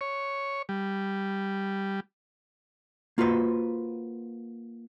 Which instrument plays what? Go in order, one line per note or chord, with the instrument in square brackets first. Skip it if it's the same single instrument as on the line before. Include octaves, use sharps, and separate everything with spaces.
[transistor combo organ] C#5
G3
[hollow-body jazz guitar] A#3 F4 F#4 B4 C5